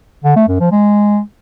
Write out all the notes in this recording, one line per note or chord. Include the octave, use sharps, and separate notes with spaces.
D3
A3
F#2
F3
G#3